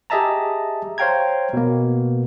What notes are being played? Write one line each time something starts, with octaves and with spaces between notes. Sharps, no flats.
G4 G#4 D#5 E5 A5 A#5
C5 C#5 F5 G5 A#5 G#6
B2 A#3